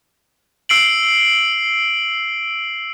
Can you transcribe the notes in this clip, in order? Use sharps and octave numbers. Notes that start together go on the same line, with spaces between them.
E6 C7 D7 F#7